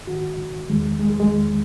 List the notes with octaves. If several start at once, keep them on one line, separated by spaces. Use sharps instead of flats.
G#2 D#3 F#4
E2 D#3 G#3
G#3
G#3
G#3
E2 D#3